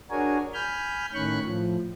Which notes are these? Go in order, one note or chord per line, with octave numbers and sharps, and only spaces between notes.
D4 F#4 G#4 A#4 C#5 G#5
G#5 B5 F6 G6
A2 D#3 C#4 B5 C#6 F#6
A2 F3